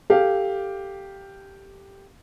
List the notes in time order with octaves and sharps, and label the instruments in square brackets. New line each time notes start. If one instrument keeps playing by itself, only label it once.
[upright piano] G4 A4 F5